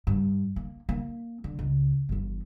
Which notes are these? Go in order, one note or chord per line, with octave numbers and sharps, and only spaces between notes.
G2
A#3
A#3
D3
C#2
G1 E3